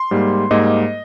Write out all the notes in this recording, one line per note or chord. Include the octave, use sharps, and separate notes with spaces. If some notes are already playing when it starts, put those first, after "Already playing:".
Already playing: C6
G#2 G3 A#3
G#2 G3 A#3 D#5